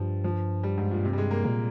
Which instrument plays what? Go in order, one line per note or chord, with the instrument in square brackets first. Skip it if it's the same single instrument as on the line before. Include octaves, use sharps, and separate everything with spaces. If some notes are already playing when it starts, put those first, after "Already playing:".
Already playing: [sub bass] G2 [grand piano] F3 G3
[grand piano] F3
G3
G#2
A#2
C3
G3
G#3
A#3
[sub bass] A#2 [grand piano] A#3